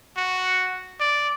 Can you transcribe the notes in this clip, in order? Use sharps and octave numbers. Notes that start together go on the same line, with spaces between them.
F#4
D5